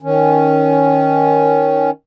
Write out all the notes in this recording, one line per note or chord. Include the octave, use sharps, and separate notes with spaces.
D#3 C#4